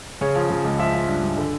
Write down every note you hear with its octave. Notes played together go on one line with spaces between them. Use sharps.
C#3 C#5
F3
C#3
C#2
F3 E5
F3
G2
G2
D3